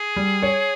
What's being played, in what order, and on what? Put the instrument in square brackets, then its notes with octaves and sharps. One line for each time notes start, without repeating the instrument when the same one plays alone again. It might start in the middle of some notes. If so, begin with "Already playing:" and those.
Already playing: [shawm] G#4
[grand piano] G3
C#5